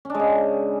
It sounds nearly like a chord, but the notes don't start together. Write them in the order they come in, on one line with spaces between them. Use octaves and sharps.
C#4 D4 G#3 C#3